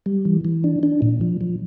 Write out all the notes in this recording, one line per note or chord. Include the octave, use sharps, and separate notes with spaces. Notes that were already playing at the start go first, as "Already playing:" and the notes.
G3
E3
E3
D4
D4
A#2
F3
F3